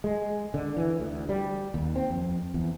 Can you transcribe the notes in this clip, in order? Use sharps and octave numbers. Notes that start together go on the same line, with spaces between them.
G#3
D3
E3
D2
G3
D#2
C4
F2
E2